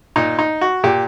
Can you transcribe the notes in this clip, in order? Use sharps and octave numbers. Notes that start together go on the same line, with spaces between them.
A#2 D#4
D#4
F#4
A#2 G4